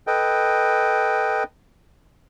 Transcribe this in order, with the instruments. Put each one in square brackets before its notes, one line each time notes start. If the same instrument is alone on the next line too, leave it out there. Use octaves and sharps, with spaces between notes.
[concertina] A4 B4 D#5 G5